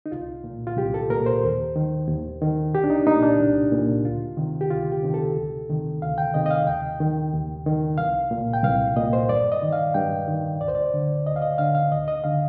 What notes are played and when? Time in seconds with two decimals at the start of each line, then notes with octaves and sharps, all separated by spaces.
0.06 D#4
0.12 C2 F4
0.44 A#2
0.67 F4
0.77 C2 G4
0.94 A4
1.10 A#2 A#4
1.26 C5
1.43 D#2
1.76 D#3
2.08 D#2
2.41 D#3
2.73 C2 G4
2.84 D4
2.90 D#4
3.06 A#2 D#4
3.23 D4
3.40 C2
3.72 A#2
4.05 D2 F4
4.37 C3 D#3
4.61 G4
4.70 D2 F4
4.92 G4
5.03 C3 D#3
5.14 A4
5.36 D2
5.69 C3 D#3
6.02 D2 F5
6.18 G5
6.34 C3 D#3 D#5
6.46 D#5
6.51 F5
6.67 D#2 G5
7.00 D#3
7.33 D#2
7.66 D#3
7.98 C2 F5
8.31 A#2
8.53 G5
8.63 C2 F5
8.96 A#2 D#5
9.13 C5
9.29 G2 D5
9.52 D#5
9.62 D#3
9.72 F5
9.94 G2 G5
10.28 D#3
10.61 D2 D5
10.68 C5
10.75 D5
10.94 D3
11.26 D2 D#5
11.36 F5
11.42 D#5
11.58 D3 F5
11.75 F5
11.92 D2 D#5
12.08 D#5
12.24 D3 F5